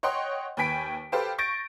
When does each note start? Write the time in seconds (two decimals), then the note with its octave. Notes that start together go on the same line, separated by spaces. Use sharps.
0.03 C#5 D#5 F#5 G5 C6
0.57 D#2 B4 G5 G#5 B6 D7
1.12 G4 A4 B4 C5 F5 G5
1.38 C#6 G6 A6 A#6 D7